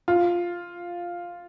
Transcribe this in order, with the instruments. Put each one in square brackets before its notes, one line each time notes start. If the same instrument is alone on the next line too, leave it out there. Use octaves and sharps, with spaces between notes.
[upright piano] F4